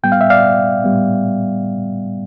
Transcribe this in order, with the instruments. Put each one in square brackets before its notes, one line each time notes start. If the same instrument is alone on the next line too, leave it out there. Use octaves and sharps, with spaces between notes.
[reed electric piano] A2 G3 B3 G5
F5
E5
D5 F5
A2 G3 B3